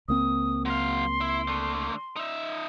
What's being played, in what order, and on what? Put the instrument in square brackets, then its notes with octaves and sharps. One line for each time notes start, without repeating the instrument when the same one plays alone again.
[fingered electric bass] C#2 A#3 C4 [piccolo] D#6
[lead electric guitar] F#3 F5 [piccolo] C6
[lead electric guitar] E4
D3 A3
D#4 E5